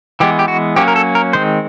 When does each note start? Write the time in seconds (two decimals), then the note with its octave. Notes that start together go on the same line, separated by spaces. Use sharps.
0.20 E3 G#3 B3 G4
0.39 G4
0.48 F#4
0.76 F#3 A#3 C#4 G4
0.88 A#4
0.96 A4
1.15 A#4
1.33 D#3 G#3 C4 C5